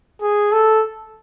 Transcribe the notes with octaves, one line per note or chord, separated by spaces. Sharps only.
G#4
A4